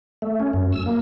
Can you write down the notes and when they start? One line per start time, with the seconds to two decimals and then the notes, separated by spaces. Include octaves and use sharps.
0.22 A3
0.40 C#4
0.53 F#2
0.72 E6
0.86 A#3